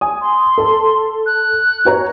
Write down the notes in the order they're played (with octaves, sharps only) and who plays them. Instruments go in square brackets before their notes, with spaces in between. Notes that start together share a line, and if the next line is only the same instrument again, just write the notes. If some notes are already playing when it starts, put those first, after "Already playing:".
[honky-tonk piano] G#5 D#6
[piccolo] C6
[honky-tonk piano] A4 A5
[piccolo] F#6
[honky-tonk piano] F#4 C#5 A#5